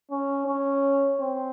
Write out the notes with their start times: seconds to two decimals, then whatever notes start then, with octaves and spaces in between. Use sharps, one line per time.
0.11 C#4
0.47 C#4
1.20 C4